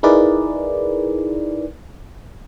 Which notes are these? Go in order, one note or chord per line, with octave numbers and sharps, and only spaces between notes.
D#4 E4 G#4 A#4 B4 D5